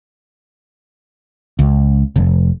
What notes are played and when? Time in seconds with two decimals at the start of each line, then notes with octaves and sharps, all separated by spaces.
1.59 C#2
2.16 F1